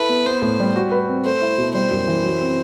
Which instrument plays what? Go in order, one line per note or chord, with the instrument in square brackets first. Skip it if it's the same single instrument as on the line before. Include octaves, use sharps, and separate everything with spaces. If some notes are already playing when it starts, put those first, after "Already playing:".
Already playing: [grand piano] E4 A4 [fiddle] B4
[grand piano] B3
[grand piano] B3 [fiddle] C5
[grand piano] A2
G3
F#4
B4
C4
[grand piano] A3 [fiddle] C5
[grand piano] E4
B2
[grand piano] G3 [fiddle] C5
[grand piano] F#2
E3
F#3
C4